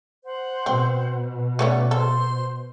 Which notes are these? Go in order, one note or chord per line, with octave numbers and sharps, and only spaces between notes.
C5 F#5
B2 C4
A3 B3 C#4 D5
A4 C5 C6